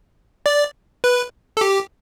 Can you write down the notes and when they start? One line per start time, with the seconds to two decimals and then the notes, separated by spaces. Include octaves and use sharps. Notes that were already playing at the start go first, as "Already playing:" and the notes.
0.46 D5
1.04 B4
1.57 A4
1.61 G4